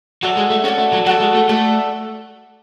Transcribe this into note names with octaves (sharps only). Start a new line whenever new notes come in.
F#3 F#4 A4 D5
G#3
A3
C#4 F#4 A4 D5
A3
F#3
F#3 F#4 A4 D5
G#3
A3
A3 F#4 A4 D5